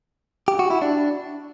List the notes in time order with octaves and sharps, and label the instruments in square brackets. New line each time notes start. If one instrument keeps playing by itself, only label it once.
[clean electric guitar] G4
F#4
E4
D4